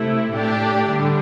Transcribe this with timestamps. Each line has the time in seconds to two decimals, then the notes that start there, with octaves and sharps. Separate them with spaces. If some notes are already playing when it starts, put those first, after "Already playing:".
Already playing: C3 A3 E4
0.33 A2 A3 D4 G4
0.89 D3 G3